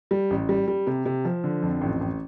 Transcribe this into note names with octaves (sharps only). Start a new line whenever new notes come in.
G3
A1
G3
G3
C3
C3
F3
D3
F2
A1
A1